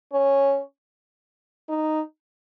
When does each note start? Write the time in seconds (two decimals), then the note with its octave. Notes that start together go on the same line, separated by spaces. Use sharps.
0.13 C#4
1.69 D#4